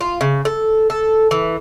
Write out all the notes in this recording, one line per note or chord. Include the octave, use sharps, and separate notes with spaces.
F4
C#3
A4
A4
E3